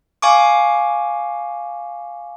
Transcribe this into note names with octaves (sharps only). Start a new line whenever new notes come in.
F5 G#5 C#6 D6